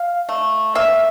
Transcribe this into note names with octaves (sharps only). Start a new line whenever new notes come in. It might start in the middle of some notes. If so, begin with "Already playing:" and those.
Already playing: F5
A3
A#3 E5